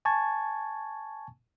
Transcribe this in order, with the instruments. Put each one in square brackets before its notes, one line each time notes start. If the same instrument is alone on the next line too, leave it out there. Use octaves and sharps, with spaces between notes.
[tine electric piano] G#5 A5 C#6 G#6 A6